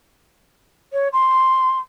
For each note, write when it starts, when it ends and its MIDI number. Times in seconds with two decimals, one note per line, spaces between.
0.92 1.08 73
1.12 1.78 84